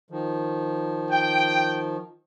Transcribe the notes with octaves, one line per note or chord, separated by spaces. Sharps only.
D#3 F3
G5